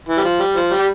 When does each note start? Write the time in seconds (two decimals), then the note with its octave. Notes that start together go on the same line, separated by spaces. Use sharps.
0.09 E3
0.18 G3
0.25 F3
0.40 G3
0.56 F3
0.72 G3
0.79 G4